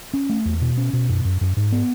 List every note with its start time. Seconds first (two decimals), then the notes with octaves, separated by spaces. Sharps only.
0.14 C#4
0.29 A3
0.45 E2
0.61 B2
0.77 C#4
0.93 B2
1.09 F#2
1.25 F#2
1.41 F#2
1.57 G#2
1.72 B3